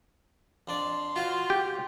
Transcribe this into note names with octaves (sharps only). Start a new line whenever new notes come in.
F2 D4 D5 C6
F4 F#4 C5 F5
G4